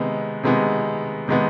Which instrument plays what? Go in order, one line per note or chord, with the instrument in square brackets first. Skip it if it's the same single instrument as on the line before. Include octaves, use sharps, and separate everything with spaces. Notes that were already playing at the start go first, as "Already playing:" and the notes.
Already playing: [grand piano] C3 D#3 G#3 B3
C3 D#3 G#3 B3
C3 D#3 G#3 B3